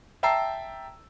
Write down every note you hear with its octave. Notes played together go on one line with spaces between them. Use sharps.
E5 G5 A5 A#5 E6 C7